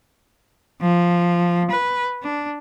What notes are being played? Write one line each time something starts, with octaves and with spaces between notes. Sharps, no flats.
F3
B4
D4